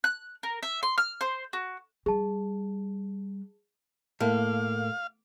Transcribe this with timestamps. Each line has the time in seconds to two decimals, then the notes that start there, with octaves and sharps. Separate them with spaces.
0.04 F#6
0.43 A#4
0.63 E5
0.83 C6
0.98 F6
1.21 C5
1.53 F#4
2.06 G3 G#4 A5
4.20 A2 A#3 F5